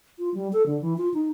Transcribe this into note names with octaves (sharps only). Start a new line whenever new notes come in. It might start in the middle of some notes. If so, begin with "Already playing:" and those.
F4
G3
A4
D3
E3
F4
D#4